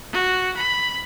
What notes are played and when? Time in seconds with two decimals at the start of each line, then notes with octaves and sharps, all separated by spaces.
0.13 F#4
0.57 B5